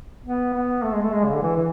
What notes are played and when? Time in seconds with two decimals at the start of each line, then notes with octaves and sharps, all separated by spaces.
0.24 B3
0.53 B3
0.83 A3
0.93 G#3
1.02 A3
1.13 G#3
1.24 C#3
1.34 D3
1.42 E3
1.56 E3